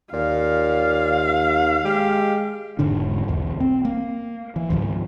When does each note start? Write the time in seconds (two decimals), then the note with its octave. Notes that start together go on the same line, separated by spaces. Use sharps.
0.13 D#2 A#2 F5
1.85 G#3 G4
2.79 E1 G#2 D3 D4
3.28 B1 E2
3.60 C4
3.85 A#3
4.56 E3
4.70 C#2 G#2 D#3 F3